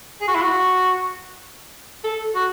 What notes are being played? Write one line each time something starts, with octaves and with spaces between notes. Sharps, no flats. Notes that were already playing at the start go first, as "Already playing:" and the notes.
G#4
F#4
E4
F#4
A4
F#4